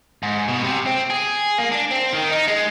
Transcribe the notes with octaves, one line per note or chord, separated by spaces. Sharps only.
G#2
B2
C3
C4
G#4
A#3
D4
C4
D#3
D#4
G#3